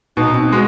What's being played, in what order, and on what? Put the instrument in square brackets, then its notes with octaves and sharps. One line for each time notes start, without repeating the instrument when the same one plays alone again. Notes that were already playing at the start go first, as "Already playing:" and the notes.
[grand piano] B2 [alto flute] D#4
[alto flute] C4
[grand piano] G#3 [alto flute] F#4